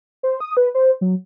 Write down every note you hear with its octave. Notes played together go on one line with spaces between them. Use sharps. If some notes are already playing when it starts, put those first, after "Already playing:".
C5
D#6
B4
C5
F#3